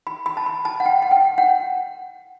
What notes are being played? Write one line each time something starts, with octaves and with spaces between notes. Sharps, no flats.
B5
B5
A5
B5
A5
F#5
G5
F#5
G5
F#5